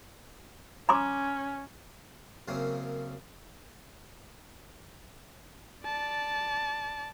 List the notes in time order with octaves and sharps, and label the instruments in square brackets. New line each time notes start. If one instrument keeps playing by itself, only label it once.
[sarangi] C#4 [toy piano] A#5 C6 D6
[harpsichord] F#2 C#3 A#3 C4 C#4
[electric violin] D5 A5